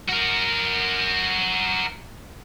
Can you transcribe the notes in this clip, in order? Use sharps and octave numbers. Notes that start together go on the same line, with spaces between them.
F#4 A#4